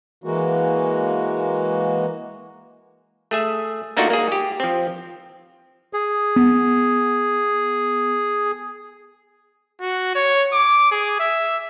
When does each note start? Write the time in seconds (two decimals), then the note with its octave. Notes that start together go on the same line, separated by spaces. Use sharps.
0.24 E3 G#3 A#3 F#4
3.31 A3 G#4 E5
3.97 A3 A#3 D4 D#4 F4 F#4
4.10 A#3 G#4
4.32 G4
4.60 F3 C4
5.93 G#4
6.36 B3
9.81 F#4
10.15 C#5
10.53 D6
10.91 G#4
11.20 E5